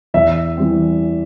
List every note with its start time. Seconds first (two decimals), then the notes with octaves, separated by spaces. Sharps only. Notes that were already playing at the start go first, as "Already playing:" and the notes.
0.14 E2 E5
0.57 E3 G3 C4